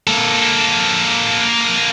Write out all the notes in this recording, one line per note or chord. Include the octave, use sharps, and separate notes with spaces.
A#3 A4